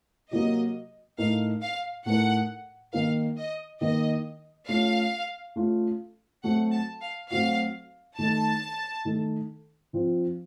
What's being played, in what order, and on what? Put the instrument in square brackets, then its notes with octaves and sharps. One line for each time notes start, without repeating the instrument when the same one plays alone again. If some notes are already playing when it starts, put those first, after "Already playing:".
[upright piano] C3 F#3 A#3 [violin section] D#5
[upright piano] A2 A3 D#4 A#4 [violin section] F5
[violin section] F5
[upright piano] A2 A3 D#4 A#4 [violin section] F#5
[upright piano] D#3 A#3 D#4 A#4 [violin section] F5
[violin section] D#5
[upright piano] D#3 A#3 D#4 A#4 [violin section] D#5
[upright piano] A3 C#4 F4 [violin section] F5
[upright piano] A3 C#4 F4
[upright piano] F#3 A3 C4 F#4 [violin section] F#5
[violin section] A5
F5
[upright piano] F#3 A3 C4 F#4 [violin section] F5
[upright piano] D#3 A3 D#4 A4 [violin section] A5
[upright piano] D#3 A3 D#4 A4
F3 C4 F4